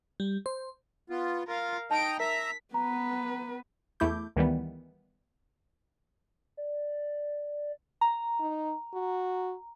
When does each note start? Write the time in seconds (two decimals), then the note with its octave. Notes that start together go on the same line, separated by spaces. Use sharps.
0.20 G3
0.46 C5
1.10 B3 F4
1.47 F4 A#4 F5
1.91 D#4 D#5 G5 A5 A#5 D7
2.20 A#4 E5 A#5 B6
2.74 B3 B4 A#5
4.00 E2 A3 E4 D6 G6
4.36 D2 D#3 E3 G3 B3
6.57 D5
8.01 A#5
8.40 D#4
8.94 F#4